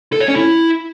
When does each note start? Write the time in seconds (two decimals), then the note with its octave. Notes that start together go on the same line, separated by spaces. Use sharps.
0.13 A4
0.20 C#5
0.28 C#4
0.36 E4